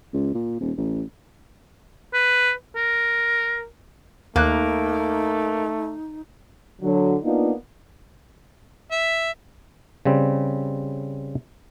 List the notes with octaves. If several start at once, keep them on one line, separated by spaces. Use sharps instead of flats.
C#2
A#2
D#1
A1
B4
A#4
D#2 A3 A#3 D#4 F#6
D3 F#3
A#3 B3 D4 D#4 F4
E5
C#3 G3 C4